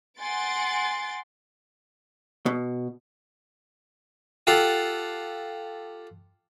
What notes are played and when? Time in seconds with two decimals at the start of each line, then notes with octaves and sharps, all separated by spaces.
0.19 F#5 G#5 C6 A6 D7
2.46 B2
4.47 F4 G4 A4 F5 F#5